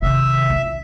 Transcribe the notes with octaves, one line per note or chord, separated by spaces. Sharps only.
C3 D#3 E5
E4 F4